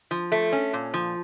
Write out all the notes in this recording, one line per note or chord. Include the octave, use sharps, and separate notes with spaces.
F3
A3
C#4
A#2
F3